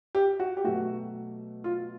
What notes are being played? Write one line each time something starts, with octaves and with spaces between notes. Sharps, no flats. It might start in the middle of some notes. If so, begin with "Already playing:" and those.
G4
F#4
G4
B2 F#3 A3 F#4
F4